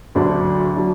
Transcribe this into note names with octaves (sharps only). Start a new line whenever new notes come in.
D2 D3 F#3 D4
F#3 D4